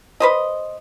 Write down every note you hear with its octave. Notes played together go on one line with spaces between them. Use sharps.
B4 C5 D#5